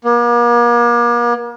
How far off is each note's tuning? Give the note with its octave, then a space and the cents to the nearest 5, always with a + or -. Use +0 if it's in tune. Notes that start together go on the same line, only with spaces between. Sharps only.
A#3 +40